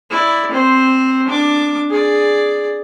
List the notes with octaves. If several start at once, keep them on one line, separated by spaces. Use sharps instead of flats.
E4 D5
C4 C5
D4 D6
G#4 D5